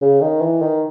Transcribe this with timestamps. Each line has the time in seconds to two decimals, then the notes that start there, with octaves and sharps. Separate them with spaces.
0.01 C#3
0.21 D#3
0.41 E3
0.62 D#3